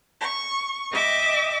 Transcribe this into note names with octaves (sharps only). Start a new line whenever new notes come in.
C#6
D#5 E5 G5 D6